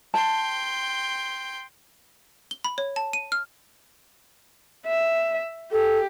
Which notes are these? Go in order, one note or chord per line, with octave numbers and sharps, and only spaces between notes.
G5 A5 C6
G7
B5
C#5
A5
D#7
F6
E5
G4 A4